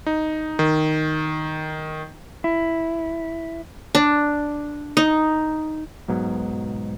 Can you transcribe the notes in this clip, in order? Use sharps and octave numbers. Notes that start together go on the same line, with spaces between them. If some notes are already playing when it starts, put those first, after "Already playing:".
D#4
D#3
E4
D4
D#4
B1 G#2 B2 F#3